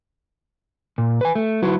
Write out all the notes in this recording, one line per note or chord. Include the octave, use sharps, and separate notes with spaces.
A#2
B4 G#5
A3
F#3 E4 F#4 B4